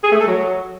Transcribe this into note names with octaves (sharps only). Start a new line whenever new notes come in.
G#4
A3
A4
F#3